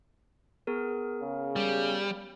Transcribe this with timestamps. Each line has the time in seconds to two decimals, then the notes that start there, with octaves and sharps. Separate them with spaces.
0.67 B3 G#4 A#4
1.21 C#3
1.56 G3